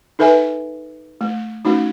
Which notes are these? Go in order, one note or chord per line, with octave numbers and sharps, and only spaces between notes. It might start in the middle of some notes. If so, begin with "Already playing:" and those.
D#4 A4 B4 E5 G#5
A3
A3 C#4 D#4 F#4